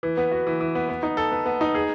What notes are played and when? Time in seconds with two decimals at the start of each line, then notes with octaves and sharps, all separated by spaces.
0.03 E3
0.17 B3
0.32 F#4
0.47 E3
0.61 E3
0.75 B3
0.89 B3
1.03 D#4
1.17 A4
1.31 B3
1.46 B3
1.61 D#4
1.75 G#4